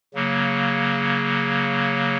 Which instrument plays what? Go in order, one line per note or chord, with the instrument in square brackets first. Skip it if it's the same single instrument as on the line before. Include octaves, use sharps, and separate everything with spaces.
[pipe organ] C#3 F#3 A#3